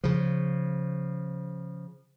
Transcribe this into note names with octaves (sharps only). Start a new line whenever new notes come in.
C#3 F3